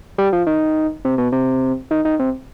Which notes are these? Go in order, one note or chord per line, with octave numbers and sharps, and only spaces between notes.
G3
F3
D#3
C3
B2
C3
D#3
D#3
C3